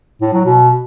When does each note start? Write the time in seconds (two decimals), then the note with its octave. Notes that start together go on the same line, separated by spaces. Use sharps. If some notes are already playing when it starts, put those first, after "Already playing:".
0.21 A2
0.33 F#3
0.45 B2